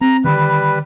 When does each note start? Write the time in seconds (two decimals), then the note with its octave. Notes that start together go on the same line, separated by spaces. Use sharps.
0.01 C4 A#5
0.24 D3 D#3 G3 B4